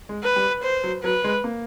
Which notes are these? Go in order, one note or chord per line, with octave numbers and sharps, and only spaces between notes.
G#3
B4
G3
C5
F#3
F#3 B4
G#3
A#3